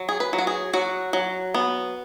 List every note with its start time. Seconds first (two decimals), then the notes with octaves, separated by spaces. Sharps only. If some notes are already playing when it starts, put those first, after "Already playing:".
Already playing: F#3
0.09 G#4
0.20 B4
0.33 F#3
0.38 F#4
0.47 G#4
0.73 F#3 F#4
1.13 F#3
1.54 B3